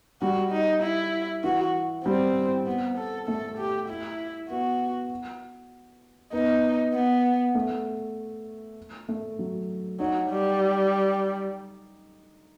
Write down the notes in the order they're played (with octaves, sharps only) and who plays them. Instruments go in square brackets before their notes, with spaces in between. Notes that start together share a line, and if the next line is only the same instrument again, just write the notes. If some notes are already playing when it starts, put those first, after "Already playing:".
[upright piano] G3 [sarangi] F#4
[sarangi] D#4
E4
[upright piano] E3 [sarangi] F#4
[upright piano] G3 [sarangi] C4
[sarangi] B3
A4
[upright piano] A3 [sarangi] A4
[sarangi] G4
E4
[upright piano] B3 [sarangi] F#4
[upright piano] B3 [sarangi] D#4
[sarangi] B3
[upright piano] A3
A3
F#3
[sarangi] F#3 [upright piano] D#4
[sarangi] G3